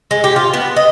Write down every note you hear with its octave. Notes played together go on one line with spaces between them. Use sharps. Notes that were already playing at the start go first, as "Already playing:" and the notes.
G#3
G4
F4
B3
D#5